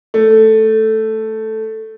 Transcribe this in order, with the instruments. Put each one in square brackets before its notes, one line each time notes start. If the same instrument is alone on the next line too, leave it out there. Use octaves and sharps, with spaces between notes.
[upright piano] A3